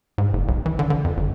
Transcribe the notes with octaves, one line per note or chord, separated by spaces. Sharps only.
G#2
F#1
B1
E3
D3
D3
F2
G1